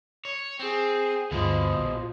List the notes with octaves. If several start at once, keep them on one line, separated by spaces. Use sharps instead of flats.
C#5
C4 G#4
D2 G2 B2 F3 G#3
A#1